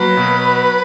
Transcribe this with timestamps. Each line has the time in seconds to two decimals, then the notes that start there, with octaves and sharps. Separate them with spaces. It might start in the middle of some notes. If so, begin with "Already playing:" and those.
Already playing: F#3 A#3 B4
0.17 B2